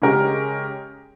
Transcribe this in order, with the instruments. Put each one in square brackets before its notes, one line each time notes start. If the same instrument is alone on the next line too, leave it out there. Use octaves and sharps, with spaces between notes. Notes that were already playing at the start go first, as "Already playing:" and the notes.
[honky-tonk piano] C#3 G#3 C#4 G4 A#4